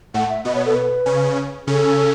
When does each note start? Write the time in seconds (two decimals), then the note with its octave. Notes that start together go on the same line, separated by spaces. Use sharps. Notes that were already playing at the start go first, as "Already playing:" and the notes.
0.14 A2 A3 F#5
0.30 E5
0.45 B2 B3 D#5
0.55 C#5
0.66 A4
0.75 B4
1.06 C#3 C#4
1.67 C#3 C#4 A4